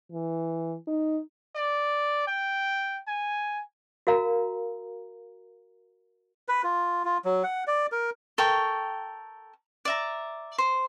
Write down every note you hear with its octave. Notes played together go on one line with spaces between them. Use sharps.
E3
D#4
D5
G5
G#5
F#4 A#4 F5 A#5
B4
F4
F4
F#3
F#5
D5
A#4
A4 A#4 G5 C#6
D5 E5 A#5
C5